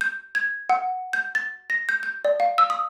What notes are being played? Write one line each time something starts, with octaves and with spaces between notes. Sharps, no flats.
G6
G#6
F#5
G6
A6
A#6
G6
G6
D5
F5
E6
D#6